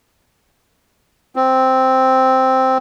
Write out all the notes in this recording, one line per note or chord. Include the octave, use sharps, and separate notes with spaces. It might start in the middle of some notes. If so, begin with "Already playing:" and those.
C4